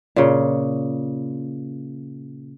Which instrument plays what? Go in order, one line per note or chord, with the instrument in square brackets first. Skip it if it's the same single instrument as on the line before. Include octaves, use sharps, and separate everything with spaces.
[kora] A#2 C#3